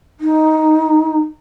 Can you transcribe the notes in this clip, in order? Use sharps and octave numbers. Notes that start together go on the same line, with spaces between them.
D#4